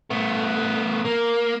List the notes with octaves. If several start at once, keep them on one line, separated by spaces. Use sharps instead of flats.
A3 B3
A#3